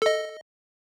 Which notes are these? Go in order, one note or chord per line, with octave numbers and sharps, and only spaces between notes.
A4 D#5